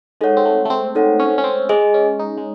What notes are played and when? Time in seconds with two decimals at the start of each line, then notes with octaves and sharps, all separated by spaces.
0.21 G#3 D#4 A4 C#5 F#5
0.37 C4
0.45 A3
0.65 A3
0.70 C4
0.95 D#4 A4 C#5 F#5
1.19 C#4
1.38 C#4
1.44 C4
1.69 G#3 G#4 D#5 G#5
1.94 C#4
2.19 D#4
2.37 G#3